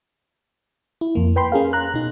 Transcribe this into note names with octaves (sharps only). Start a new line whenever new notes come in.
E4
F2 A#3
B4 G5 B5 C6
C#4 G#4 A#4 F5
A#5 F#6
B2 D#4